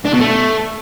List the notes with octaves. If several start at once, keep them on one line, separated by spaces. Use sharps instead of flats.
D4
B2
A3